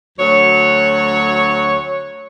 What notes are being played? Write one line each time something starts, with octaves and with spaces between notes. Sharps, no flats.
D2 F#3 C#5